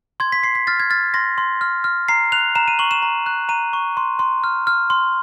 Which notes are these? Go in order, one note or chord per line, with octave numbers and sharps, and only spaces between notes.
C6 G#6
B6
C6 C7
B6
F6 A6
G#6
F6 A6
C6 A#6
C6
F6
F6
A#5 C7
F#6 F7
A#5 E7
D#7
C#6 F#7
E7
A#5
F#6
A#5 D#7
C#6
C6
C6
F6
F6
C6